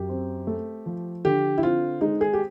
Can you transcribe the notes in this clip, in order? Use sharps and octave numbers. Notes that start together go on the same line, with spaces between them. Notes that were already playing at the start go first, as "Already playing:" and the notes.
Already playing: F#2 G4
C4
A3
F3
D3 G4
E4
C4 F4
G#3 D#4
G#4
G4